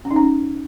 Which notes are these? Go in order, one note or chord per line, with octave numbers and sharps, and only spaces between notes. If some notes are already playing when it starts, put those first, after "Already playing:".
C#4
D#4
C#4